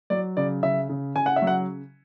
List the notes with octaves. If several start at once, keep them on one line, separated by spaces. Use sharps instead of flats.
F#3 D5
C#3 D5
C#3 E5
C#3
C#3 G#5
F#5
E5
F#3
F#5